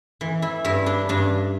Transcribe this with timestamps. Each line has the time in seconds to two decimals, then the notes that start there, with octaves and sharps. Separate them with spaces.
0.21 E3
0.42 E4
0.64 G2 E4
0.86 D4
1.09 G2 D4